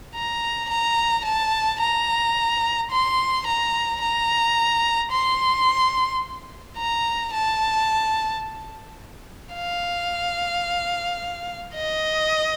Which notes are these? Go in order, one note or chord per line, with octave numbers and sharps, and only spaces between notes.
A#5
A#5
A5
A#5
C6
A#5
A#5
C6
A#5
A5
F5
D#5